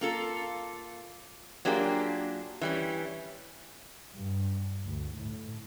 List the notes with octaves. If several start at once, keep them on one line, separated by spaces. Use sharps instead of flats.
A#3 F4 A4
F#3 A#3 D4 F4 G4 G#4
E3 G3 C#4
G2
D2
A2